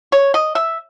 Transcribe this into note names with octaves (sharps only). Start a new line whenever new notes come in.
C#5
D#5
E5